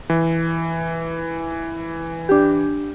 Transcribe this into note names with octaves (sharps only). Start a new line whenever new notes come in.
E3
D4 G4